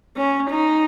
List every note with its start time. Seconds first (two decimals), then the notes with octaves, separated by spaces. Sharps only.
0.17 C#4
0.50 D#4